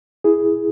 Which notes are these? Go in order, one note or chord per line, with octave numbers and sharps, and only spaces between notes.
E4 G#4